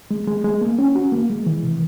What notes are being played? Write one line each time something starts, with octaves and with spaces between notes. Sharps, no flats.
G#3
G#3
G#3
A#3
C#4
F#4
A#3
G#3
E3
C3